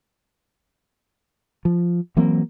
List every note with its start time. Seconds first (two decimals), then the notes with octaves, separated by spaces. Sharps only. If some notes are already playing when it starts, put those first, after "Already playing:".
1.65 F3
2.17 E3 F#3 A#3 C4